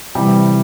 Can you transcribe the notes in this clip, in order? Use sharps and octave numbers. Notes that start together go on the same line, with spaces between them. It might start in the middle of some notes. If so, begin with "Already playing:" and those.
C3 E3 G3